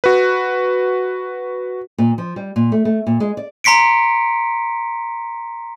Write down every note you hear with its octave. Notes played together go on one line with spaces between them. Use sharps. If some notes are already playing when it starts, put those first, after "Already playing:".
F#4 B4
A#2
F3
G3
A#2
A3
A3
A#2
G#3
D5
A#5 C6 B6 C#7 D7